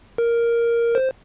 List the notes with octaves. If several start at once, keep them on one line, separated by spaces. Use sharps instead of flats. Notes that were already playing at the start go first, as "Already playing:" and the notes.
A#4
C5